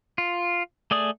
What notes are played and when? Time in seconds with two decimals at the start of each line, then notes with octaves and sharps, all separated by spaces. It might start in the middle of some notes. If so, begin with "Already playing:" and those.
0.18 F4
0.91 A3 G#4 D5 D#6